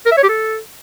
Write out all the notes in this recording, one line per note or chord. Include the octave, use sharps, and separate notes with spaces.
A#4
E5
C#5
G4
A4